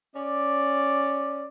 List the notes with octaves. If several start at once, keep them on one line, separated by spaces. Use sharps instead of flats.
C#4 D5